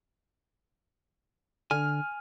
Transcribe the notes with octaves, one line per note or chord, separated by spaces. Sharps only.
D3 G#5 F6